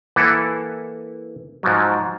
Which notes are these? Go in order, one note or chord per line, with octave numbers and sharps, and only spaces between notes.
E3 A#3 E4 A4 B4 F#5
G#2 F3 F#3